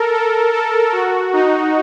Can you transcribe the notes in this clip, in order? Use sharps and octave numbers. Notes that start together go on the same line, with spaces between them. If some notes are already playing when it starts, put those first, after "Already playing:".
Already playing: A4 A#4
A4
A4
F#4
D#4